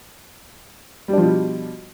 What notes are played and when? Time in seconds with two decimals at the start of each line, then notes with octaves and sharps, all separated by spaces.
1.08 G3
1.13 D4
1.18 F3
1.22 B2